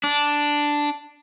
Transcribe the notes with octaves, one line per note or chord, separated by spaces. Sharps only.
D4